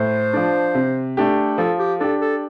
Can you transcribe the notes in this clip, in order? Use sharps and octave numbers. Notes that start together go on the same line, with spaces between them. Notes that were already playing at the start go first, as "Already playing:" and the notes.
Already playing: A2 C5
F3 D4
C3
A3 D4 G4
F3 A4
G4
D4 G4 A4
A4